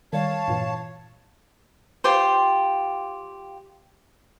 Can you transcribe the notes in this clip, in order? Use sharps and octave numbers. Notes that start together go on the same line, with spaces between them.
D#3 G3 C#5 F5 A5
G2 A#2 E3
F4 G4 C5